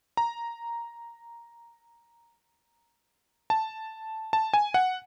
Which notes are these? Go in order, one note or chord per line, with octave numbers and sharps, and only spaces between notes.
A#5
A5
A5
G#5
F#5